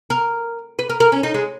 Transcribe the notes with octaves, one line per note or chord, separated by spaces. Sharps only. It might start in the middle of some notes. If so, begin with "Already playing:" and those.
A#4
B4
A#4
A#4
C#4
D#4
G#3